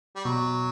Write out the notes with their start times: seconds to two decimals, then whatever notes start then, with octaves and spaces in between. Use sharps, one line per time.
0.16 G3
0.25 B2 F#3